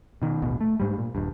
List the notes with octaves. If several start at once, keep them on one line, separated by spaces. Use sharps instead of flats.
B2 D#3
A1 D#2 B2
A3
G#2 G3
A#2
D#1 G2